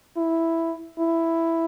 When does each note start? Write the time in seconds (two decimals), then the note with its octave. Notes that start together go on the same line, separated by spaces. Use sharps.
0.17 E4
0.99 E4